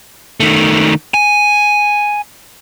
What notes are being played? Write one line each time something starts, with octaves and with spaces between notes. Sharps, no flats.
D#3 A3
G#5